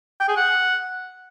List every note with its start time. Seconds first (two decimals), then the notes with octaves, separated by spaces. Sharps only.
0.20 G5
0.28 G#4
0.37 F#5